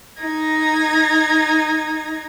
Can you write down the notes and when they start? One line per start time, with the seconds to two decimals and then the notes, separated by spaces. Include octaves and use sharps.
0.21 D#4 G#6 A#6